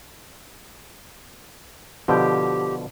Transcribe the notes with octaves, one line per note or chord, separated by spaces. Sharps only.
B2 D3 F3 G4